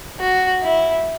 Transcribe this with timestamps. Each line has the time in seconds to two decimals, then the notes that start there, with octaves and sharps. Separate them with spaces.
0.20 F#4
0.62 E4